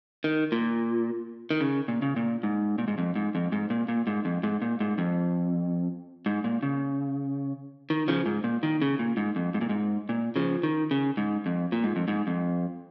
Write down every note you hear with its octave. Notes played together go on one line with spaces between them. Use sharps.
D#3
A#2
D#3
C#3
A#2
C#3
A#2
G#2
A#2
G#2
F2
G#2
F2
G#2
A#2
A#2
G#2
F2
G#2
A#2
G#2
F2
G#2
A#2
C#3
D#3
C#3 F3
G#2
A#2
D#3
C#3
A#2
G#2
F2
G#2
A#2
G#2
A#2
C#3 F3
D#3
C#3
G#2
F2
A#2
G#2
F2
G#2
F2